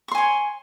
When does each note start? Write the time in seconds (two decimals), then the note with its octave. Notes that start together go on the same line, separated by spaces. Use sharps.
0.08 C#6
0.11 C6
0.15 G#5
0.18 C#5